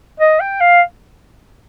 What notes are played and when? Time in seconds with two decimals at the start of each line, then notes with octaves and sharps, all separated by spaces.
0.20 D#5
0.40 G5
0.61 F5